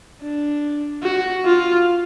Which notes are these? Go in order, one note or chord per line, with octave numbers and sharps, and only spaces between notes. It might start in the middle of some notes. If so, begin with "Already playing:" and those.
D4
F#4
F4